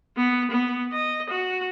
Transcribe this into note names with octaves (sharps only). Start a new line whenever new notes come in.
B3
B3
D#5
F#4